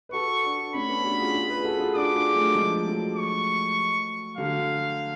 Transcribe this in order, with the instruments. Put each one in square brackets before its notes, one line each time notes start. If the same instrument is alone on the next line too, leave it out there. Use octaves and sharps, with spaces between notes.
[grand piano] B4
[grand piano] F#4 A4 [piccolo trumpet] C#6
[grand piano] D4 F#4
[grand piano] A3 C#4 [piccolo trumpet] B5
[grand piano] B3 D4
D4 F#4
F4 G#4
F4 G#4
G#4 B4
F#4 A4
F4 G#4
[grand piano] D4 F#4 [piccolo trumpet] D6
[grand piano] F4 G#4
F#3 A3
F3 G#3
F#3 A3
[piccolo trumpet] C#6
[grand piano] D3 F#3 [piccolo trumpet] F5